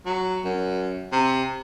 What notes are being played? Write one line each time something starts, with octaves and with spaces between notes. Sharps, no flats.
F#3
F#2
C3